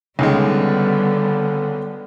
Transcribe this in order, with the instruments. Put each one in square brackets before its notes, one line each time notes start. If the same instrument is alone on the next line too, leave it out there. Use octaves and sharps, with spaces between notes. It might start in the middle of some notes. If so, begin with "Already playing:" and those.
[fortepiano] C#2 D#3 G#3 [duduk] D3 [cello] G3 B3